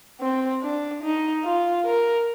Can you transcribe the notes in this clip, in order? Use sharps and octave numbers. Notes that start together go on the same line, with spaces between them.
C4
D4
D#4
F4
A#4